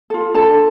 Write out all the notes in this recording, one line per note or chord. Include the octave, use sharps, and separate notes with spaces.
F4 A4
D4 A4 A5